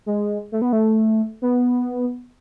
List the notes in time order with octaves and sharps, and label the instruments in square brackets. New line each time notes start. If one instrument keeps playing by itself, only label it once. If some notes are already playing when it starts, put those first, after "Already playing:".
[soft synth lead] G#3
A3
B3
A3
B3